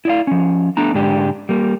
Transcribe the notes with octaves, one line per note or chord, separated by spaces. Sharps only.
E4 D5 F5
F3 C#4
A3 B3 D4 A#5
G#2 D3 G#3 D4 G4
G3 A#3